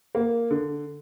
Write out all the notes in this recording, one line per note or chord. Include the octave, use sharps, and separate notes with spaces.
A#3
D3